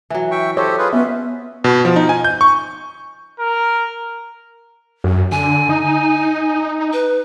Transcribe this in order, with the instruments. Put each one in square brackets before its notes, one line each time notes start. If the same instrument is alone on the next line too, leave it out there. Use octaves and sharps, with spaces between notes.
[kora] E3 F#3
[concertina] E5 G5 C#6
[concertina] G4 A4 C5 [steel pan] C#5 [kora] D#5
[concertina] F4 G#4 B4
[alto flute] B3 [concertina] C#4 [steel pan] E5
[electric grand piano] B2
F3
D#4
G#5
G6
C#6
[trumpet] A#4
[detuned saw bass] F#2
[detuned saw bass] D3 [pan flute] G#5
[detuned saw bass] D#4
[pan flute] B4